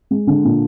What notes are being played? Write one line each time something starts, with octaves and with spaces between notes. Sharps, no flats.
G#3
D3
A#2